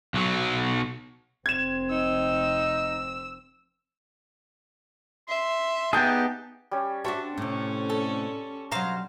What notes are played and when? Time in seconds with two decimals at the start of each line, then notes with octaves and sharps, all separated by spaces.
0.14 B1 F#3
1.46 F1 C4 G#6 E7
1.91 D#4 E6
5.29 E5 C6
5.93 B3 D#4 G4 G#4 G5 A5
6.71 G3 C#4
7.05 D4 F#4 E5 A5 C6 C#6
7.38 A2 C3 C#4
7.90 A4
8.72 B2 F#3 C5 F5 A#5